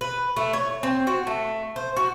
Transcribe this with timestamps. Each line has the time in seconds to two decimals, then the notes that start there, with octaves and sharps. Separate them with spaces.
0.01 B4
0.36 A3
0.53 C#5
0.83 C4
1.07 F#4
1.27 A3
1.76 C5
1.97 F#4